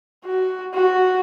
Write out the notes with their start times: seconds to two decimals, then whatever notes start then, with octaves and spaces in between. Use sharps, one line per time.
0.24 F#4
0.74 F#4